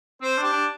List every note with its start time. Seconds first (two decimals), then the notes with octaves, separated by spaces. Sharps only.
0.21 C4 C5
0.37 D4
0.43 G4
0.53 D4